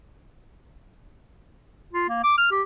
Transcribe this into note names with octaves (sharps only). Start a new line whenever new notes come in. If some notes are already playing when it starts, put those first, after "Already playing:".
F4
A#3
D6
F6
G4